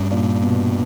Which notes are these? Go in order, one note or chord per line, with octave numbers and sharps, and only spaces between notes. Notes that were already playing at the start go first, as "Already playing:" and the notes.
Already playing: G2 G3 C#4
A#2
B2